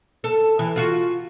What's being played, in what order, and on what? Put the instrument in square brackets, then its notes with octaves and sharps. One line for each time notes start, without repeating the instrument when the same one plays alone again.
[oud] A4
E3
F4 F#4